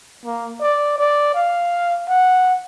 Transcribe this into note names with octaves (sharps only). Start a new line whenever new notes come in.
A#3
D5
D5
F5
F#5